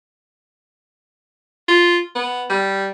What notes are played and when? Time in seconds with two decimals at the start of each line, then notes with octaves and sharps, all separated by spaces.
1.68 F4
2.16 B3
2.50 G3